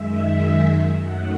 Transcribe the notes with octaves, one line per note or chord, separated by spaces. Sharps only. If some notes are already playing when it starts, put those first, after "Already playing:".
Already playing: F#2 D#3 G#3 E5
F#2 D#3 F#3 A3 F#5